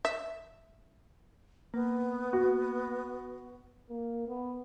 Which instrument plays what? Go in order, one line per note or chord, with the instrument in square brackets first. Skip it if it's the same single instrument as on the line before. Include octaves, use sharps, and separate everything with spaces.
[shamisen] E5
[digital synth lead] A#3 [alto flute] B3
[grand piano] F#4
[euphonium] A#3
B3